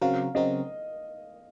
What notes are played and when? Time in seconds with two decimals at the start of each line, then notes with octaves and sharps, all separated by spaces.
0.01 C#3 F#3 C4 F#4 A#4 F5
0.35 C#3 F#3 C4 F#4 A#4 D#5